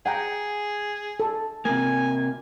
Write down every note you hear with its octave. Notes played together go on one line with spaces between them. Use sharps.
G#4 F#5 G5 A#5
A4
C3 A#3 G#5